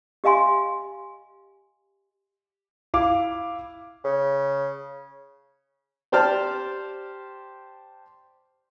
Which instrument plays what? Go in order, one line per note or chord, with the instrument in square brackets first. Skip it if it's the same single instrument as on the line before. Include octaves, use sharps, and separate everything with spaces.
[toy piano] G4 D#5 F5 G#5 C6
[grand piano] E4 F5 D6
[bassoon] C#3
[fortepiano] G4 C5 D5 A5 F6